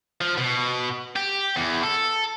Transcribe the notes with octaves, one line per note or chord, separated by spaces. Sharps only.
F3
B2
G4
E2
A4